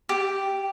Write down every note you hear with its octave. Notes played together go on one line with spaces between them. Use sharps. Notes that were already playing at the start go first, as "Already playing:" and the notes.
G4